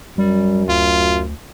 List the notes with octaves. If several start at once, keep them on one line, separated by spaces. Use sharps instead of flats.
F#2 G3
D2 F4